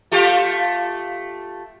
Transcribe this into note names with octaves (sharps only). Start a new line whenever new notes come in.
A3 F4 G4